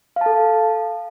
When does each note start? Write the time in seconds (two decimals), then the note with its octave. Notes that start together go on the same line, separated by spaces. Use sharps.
0.16 F5
0.21 A5
0.26 A4